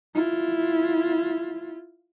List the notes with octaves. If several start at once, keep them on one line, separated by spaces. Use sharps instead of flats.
E4 F4